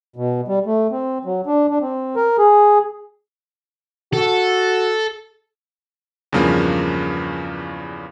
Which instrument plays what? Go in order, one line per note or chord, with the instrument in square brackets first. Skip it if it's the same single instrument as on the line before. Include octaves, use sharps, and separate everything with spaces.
[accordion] B2
G3
A3
C4
F#3
D4
D4
C4
A#4
G#4
[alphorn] F#4 [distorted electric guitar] A4
[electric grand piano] E2 G2 C#3 F3 A#3